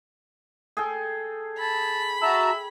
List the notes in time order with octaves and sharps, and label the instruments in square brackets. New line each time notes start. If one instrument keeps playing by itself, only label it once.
[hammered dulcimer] G#4 A4 G5
[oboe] A5 [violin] B5
[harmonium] F#4 A5 A#5 [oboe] E5